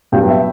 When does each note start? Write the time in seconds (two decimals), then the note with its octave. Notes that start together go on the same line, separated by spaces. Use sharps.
0.12 G2 F#3 B3 G4 G5
0.29 E5